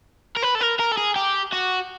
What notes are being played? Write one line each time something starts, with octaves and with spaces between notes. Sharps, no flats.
A#4
B4
A4
A#4
A#4
A4
G#4
G4
F#4